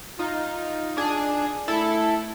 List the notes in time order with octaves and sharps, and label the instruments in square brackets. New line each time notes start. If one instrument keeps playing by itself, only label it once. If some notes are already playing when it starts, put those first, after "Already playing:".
[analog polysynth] D#4 [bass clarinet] F4
[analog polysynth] D4 G#4
[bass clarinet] A3 [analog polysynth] E4 A4